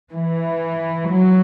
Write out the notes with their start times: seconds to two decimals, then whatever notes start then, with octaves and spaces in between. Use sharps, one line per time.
0.11 E3
1.13 F#3